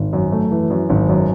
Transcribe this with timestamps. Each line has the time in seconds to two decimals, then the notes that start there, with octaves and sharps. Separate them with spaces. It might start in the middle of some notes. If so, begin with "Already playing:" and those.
Already playing: G#1
0.13 F#2
0.32 A3
0.51 E3
0.70 F#2
0.90 G#1
1.09 F#2